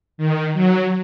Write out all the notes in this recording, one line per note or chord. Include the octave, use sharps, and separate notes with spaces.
D#3
F#3